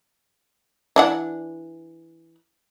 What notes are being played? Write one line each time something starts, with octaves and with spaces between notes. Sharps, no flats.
E3 D4 F#5